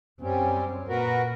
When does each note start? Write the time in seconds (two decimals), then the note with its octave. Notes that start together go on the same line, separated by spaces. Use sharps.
0.21 F#2 G3 C4 C#4
0.88 A#2 F#4 A#4 B4